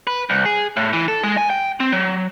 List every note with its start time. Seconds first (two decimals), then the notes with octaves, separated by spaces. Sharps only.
0.07 B4
0.30 C2
0.46 G#4
0.77 A2
0.93 E3
1.08 A4
1.24 G#3
1.37 G#5
1.50 G5
1.80 C4
1.92 F#3